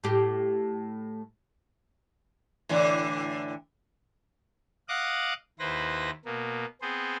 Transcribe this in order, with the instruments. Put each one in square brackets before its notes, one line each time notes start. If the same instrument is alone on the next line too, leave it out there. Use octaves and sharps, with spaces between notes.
[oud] A2 G4
[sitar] A2 D3 E3
[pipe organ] D#5 F5 F#5 D6 D#6 F#6
D#2 E4 B4 C5 A#6
B2 A#3
B3 C4 G#4 C5